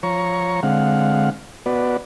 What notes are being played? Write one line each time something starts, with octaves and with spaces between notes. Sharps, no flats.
F3 C#5 A#5 C#6
D3 G#3 C4 F5 F#5
B3 F#4 B4 D5